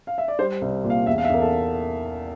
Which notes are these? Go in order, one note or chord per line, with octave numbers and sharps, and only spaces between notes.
F5
E5
D5
G3 C5
C2
A#2
F5
E2 E5
F5
E5
E2 A#4
A4